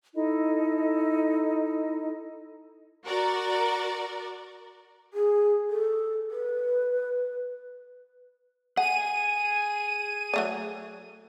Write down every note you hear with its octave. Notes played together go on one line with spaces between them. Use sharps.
D#4 E4 A4 D#5
F#4 A#4 D5
G#4
A4
B4
G#4 F#5 G#5 D#7
F#3 A3 D5